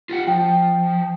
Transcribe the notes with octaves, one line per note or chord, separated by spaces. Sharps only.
F4 G4 F#5
F3 G5